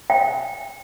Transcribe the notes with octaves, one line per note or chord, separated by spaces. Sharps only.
G5